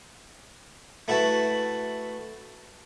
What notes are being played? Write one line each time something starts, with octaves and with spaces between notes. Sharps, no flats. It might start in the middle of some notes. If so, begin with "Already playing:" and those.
A3 E4 F#4 B4 A5